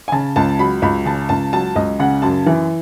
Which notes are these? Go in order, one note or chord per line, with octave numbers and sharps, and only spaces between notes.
G#5
C#3 A5
C#2 A5
F#3 B5
C#2 B5
C#3 A5
C#2 A5
F#3 A5
C#2 D#5
C#3 F#5
F#2 A5
E3